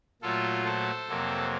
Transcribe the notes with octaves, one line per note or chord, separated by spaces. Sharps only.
A#2 F#3 A3 F4 A4
A4 C5
F2 C3 F#3 A#3